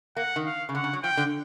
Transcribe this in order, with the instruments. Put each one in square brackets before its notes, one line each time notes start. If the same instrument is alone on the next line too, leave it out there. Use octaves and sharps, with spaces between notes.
[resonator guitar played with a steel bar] A#3 [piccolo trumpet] F#5
[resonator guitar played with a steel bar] D#3
[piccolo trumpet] F5
[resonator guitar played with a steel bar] C#3
[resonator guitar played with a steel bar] D3 [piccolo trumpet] F#5
[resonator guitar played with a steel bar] C#3
F#3
[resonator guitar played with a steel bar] F3 [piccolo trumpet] G5
[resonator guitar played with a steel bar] D3